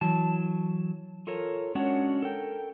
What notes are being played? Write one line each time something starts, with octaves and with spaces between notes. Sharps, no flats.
E3 F#3 A5
F4 A4 A#4 C#5
G#3 C#4 D4 F#4 C#5 F#5
A4 A#4 G5